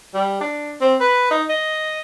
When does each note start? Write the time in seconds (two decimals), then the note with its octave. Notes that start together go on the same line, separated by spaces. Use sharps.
0.14 G3
0.41 D4
0.81 C4
1.00 B4
1.31 D#4
1.49 D#5